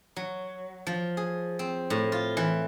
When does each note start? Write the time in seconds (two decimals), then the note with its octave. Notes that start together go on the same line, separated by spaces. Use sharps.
0.16 F#3
0.87 F3
1.17 G#4
1.59 C4
1.90 A2
2.12 F4
2.37 E3